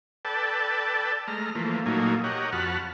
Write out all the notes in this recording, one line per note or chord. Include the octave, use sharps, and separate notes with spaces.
A4 B4 D5 G5 A5
G#3 A3 A#5 F6
E3 F3 A3 A#3
A#2 F#3 A3 A#3 D#4 G#5
G4 A#4 C#5 D#5 F#5
F2 F#4 F#5 A5 B5 F6